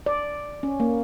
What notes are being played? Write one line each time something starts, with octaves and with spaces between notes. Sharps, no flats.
D5
C#4
A#3